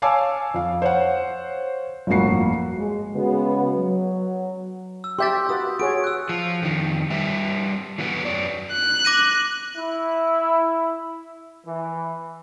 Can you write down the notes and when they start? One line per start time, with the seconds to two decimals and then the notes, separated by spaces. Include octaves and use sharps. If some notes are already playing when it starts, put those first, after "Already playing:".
0.02 C#5 F5 G#5 A5 D6 E6
0.54 F2 F5
0.82 C5 C#5 F5 F#5
2.07 G1 F2 A2 A#3 F#4 C7
2.76 G#3
3.15 C#3 G#3 B3 F#4
3.76 F#3
5.04 E6
5.19 G4 E5 C6 G6 A6
5.49 F#4 B4 D#6
5.80 F#4 G#4 C#5 D7
6.04 E6 F#6
6.29 F3
6.62 F2 D#3 D#4
7.10 G3 B4 E5
7.98 E3 F#3 B3 F#4 B4
8.25 F#2 F#3 D5
8.72 F#6
9.05 D6 A#6 D#7
9.77 E4
11.66 E3